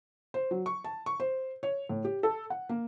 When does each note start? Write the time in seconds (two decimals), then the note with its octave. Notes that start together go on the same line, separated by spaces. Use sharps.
0.34 C5
0.51 F#3
0.66 C#6
0.84 A5
1.06 C#6
1.20 C5
1.63 C#5
1.89 A2
2.05 G4
2.23 A4
2.50 F#5
2.69 A#3